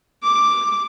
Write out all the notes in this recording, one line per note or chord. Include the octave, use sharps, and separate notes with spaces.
D6